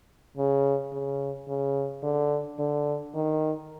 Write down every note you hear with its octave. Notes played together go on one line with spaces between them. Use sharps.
C#3
C#3
C#3
D3
D3
D#3